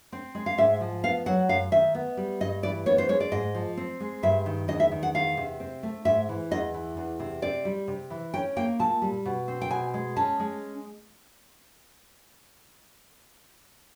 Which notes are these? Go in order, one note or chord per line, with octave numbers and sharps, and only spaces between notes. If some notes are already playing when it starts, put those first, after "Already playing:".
C4
G#3
F5
G#2 E5
F3
B3 F5
F#3 F#5
F#2 F5
D#3 E5
B3
G3
G2 D#5
E3 D5
B3 C#5
C5
G#3 C#5
D5
G#2 D#5
F3
C4
G#3
G2 E5
D#3
E2 D#5
E5
D#3
F#5
E2 F5
C3
C4
A3
G#2 E5
E3
E2 D#5
E3
E2
C3
C4 D5
G3
C3
E3
C#4 G5
A#3 G5
A#2 A5
G3
B2
C4
G5
B2 G#5
G#3
C#4 A5
G#3